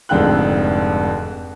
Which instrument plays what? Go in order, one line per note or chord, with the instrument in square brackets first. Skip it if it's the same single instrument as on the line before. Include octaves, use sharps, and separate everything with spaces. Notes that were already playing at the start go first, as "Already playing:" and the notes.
[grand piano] F1 F2 G#2 D3 G5 F#6